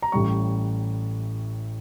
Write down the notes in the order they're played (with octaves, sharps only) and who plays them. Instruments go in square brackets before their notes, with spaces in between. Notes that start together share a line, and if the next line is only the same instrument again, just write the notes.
[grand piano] A#5
A1 A2 G3 C#6